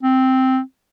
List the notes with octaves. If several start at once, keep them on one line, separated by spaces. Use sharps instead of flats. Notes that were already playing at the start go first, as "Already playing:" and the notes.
C4